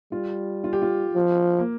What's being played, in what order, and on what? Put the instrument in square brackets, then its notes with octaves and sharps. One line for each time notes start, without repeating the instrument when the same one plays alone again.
[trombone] G3 [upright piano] F4
[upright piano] F4
G4
F4
[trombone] F3
[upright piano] A#3